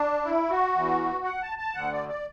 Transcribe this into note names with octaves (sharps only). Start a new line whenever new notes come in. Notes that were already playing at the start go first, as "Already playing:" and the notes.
Already playing: D4
E4
F#4
E2 E3
F#5
A5
A5
D2 D3 F#5
D5
D5